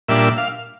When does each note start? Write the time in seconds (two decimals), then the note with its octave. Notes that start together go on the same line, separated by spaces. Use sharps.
0.08 A#2 G3 D4 E5
0.38 F5